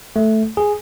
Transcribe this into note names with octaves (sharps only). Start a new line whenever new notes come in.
A3
G#4